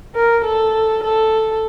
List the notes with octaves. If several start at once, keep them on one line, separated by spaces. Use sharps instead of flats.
A#4
A4
A4